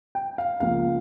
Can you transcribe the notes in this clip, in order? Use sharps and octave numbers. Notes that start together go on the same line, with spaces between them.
G5
F5
C#2 C#3 F3 A#3 F5